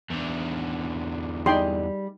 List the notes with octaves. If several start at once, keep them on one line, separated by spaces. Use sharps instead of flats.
E2 D3
G3 D#4 G#4 D5 G5 C6